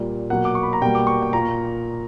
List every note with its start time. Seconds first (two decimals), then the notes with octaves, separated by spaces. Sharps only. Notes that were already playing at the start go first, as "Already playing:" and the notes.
Already playing: A#2 G3 A#3
0.30 B2 F#3 A#3 F#5
0.45 D6
0.55 C#6
0.63 B5
0.73 A#5
0.82 B2 G3 A#3 G5
0.95 D6
1.07 C#6
1.22 G5
1.33 A#2 A#3 A#5